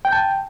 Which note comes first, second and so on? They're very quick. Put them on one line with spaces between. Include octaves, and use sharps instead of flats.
G5 G6 A5